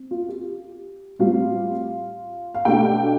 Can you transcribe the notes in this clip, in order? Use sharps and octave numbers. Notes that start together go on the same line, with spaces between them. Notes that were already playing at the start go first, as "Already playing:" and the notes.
Already playing: C4
F4
G4
A2 G3 C4 F4 F5
F5
B2 A3 D4 G4 G5